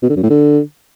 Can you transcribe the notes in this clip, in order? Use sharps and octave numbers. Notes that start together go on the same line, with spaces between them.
B2
D3
F#2
A2
D3